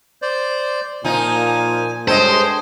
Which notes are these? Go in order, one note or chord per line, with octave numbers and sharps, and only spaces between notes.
C5 D5
A#2 F3 D#4 G#5
G2 G#3 A4 C5 C#5 D#5 G5